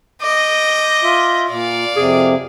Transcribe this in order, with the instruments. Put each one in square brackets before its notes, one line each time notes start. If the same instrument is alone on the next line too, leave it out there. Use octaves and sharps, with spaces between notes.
[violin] D#5 G6 [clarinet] D6
[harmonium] F4 E5
[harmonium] A#2 [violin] D5 F5
[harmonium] F2 C3 [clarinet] G#4